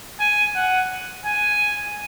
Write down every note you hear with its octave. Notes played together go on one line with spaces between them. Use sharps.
G#5
F#5
G#5